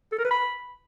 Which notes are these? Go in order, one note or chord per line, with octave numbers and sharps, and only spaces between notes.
A4
A#4
B4
B5